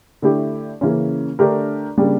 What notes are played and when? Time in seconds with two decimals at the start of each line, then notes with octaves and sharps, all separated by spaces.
0.22 D3 A3 E4 G4
0.81 C#3 E3 A#3 C#4
1.39 D3 A3 D4 G4 A#4
1.98 C#3 G3 A#3 D4